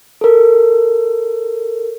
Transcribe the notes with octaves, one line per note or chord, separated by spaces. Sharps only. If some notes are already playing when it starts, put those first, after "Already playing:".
A4 A#4